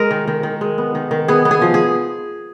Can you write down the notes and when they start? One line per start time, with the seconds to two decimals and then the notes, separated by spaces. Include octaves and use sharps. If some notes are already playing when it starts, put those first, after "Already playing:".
Already playing: G#3 A#4
0.11 D#3
0.28 D#3
0.43 D#3
0.61 G#3
0.78 B3
0.95 D#3
1.11 D#3
1.28 B3 G#4
1.45 B3
1.51 G#4
1.62 F3
1.74 G#4